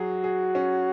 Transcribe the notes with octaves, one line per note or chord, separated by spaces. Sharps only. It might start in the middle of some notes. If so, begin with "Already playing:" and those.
Already playing: F#3 F#4 G#4
G#4
C#4